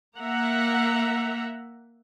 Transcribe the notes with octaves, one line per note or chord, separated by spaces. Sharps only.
A#3 E5 F#5 A#5